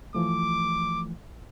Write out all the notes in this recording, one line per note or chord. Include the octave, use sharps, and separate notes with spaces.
E3 F3 A3 D6